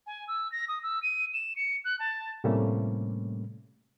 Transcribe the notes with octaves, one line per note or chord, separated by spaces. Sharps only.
G#5
E6
A#6
D#6
E6
D#7
E7
C#7
F#6
A5
A2 C3 G3 A3 A#3 C#4